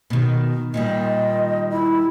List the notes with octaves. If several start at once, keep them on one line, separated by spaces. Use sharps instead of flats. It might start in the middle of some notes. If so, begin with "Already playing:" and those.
B2 D#3
A#2 D#3 G3 D#5
E4